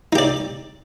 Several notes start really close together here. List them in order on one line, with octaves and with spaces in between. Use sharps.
D#4 G4 D5